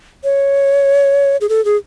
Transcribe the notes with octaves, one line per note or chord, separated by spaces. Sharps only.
C#5
G#4
A4
G#4